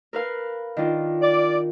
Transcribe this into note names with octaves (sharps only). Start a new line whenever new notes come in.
A#4 B4 F5
D#3 D4 F4
D5